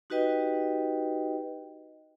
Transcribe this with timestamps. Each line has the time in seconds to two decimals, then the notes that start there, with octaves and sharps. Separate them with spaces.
0.10 D#4 F#4 G4 B4 D#5 G5